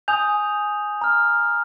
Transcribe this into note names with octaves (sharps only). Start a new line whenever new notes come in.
G#5 D#6 G6 F7
A#5 F6